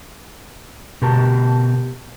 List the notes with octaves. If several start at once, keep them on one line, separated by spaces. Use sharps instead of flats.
B2 G4 A#4 A5